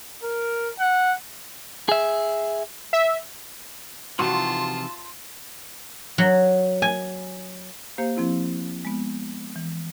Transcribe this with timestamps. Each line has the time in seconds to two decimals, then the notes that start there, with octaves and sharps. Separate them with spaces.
0.23 A#4
0.79 F#5
1.89 G#4 E5
2.93 E5
4.19 C3 E3 F3 D#4 F4 F#4 A5 C6
6.18 F#3
6.82 G#5
7.98 A#3 G4 C5 F5
8.17 F3 C4 E4
8.85 G#3 B3
9.56 E3